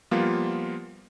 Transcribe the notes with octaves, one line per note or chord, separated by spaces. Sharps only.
F3 G3 A#3 B3 F4